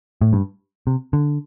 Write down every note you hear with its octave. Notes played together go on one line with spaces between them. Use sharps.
A2
G2
C3
D3